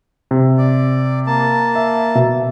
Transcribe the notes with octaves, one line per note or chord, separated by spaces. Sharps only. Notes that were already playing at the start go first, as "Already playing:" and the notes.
C3
D5
A#3 A5
E5
B2 E5